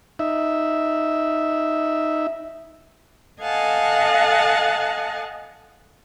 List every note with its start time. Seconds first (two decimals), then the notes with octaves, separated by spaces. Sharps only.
0.19 D#4 E5
3.42 A4 D#5 F5 F#5 G#5 A5